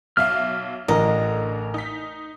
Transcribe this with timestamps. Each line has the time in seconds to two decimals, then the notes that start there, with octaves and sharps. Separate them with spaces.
0.17 B1 E5 F5 F6
0.88 A1 D3 A#4 D#5 A#5
1.74 D#4 B6